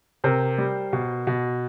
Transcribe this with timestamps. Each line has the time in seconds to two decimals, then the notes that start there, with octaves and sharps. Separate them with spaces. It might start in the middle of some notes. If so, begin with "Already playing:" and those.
0.24 C3 A#4 C5
0.58 G3
0.93 B2
1.27 B2